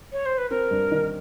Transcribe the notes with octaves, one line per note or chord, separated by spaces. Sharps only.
C#5
C5
B4
C4 A#4
G2
D#3